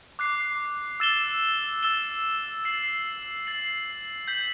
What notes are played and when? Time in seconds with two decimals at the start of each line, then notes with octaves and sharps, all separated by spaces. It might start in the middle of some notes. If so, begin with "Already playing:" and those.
0.19 D6 F#6 C7
1.00 E6 A6 E7 G7
1.83 E6 A6 E7 G7
2.65 A6 C7 F#7
3.47 A6 C7 F#7
4.28 G6 B6 F#7